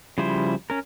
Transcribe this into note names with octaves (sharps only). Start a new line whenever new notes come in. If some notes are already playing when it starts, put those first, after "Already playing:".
C#3 F3 G3 E4 C5
C#4 A#4